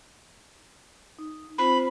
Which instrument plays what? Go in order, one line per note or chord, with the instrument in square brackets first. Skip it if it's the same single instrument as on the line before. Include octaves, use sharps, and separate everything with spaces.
[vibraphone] D#4
[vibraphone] C4 F4 C5 [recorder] B5